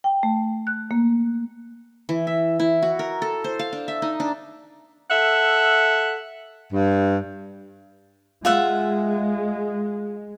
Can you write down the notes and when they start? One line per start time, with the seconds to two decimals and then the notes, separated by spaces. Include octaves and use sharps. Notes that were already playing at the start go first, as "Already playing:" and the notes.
0.04 G5
0.23 A3
0.67 F#6
0.91 A#3
2.09 E3
2.27 E5
2.60 E4
2.82 F#4
2.99 A#4
3.22 A4
3.44 C5
3.59 F5
3.73 D4
3.88 E5
4.02 D#4
4.20 D4
5.11 A4 E5 F#5
6.73 G2
8.45 G#3 F4 E5 F#5